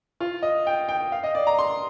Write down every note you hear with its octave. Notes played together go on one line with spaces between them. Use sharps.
F4
D#5
G5
G5
F5
D#5
D5
A#5
C6